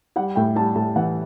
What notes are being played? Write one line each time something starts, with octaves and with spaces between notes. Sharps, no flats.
G3 F#5
A2 G5
G3 A5
A2 A5
E3 F#5